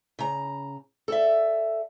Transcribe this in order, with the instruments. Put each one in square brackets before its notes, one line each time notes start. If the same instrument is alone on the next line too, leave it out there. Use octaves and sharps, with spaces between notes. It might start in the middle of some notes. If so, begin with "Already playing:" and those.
[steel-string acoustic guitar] C#3 A#5
A4 D5 E5